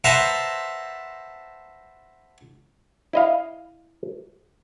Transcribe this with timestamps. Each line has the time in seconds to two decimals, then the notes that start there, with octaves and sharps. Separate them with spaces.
0.04 B4 C5 E5 F#5 A5 A#5
3.13 E4 D#5 F5